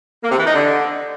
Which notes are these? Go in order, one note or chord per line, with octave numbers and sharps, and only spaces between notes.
A#3
C3
E3
D#4
D3